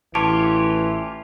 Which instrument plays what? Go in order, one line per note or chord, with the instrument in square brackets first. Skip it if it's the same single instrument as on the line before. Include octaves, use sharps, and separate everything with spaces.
[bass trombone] A1 [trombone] E3 [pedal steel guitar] F4 G4 C#5 [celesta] A5